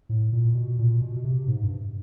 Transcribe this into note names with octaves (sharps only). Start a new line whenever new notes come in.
A2
A#2
B2
A#2
B2
B2
C3
G#2
G2